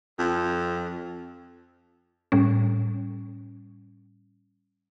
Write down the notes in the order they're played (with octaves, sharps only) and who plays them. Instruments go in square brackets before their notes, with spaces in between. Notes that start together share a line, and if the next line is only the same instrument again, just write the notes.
[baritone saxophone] F2
[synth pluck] A2 G3 C#4